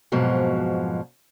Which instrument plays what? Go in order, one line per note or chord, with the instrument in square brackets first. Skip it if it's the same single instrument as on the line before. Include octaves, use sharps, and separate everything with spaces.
[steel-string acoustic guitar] F2 G#2 B2 F3 F#3